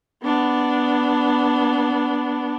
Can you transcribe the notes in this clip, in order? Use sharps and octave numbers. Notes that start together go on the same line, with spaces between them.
B3 D4